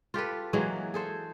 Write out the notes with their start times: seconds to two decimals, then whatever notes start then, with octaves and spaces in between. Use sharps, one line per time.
0.14 F4 G4 A4 B4
0.53 E3 F#3 G#3 A#3
0.94 G#4 A4 C5